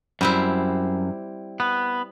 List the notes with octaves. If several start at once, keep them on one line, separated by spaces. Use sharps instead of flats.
F#2 G3 C4 E4
B3